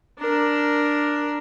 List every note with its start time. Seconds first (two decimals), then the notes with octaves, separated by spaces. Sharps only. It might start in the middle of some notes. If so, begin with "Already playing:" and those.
0.19 D4 A#4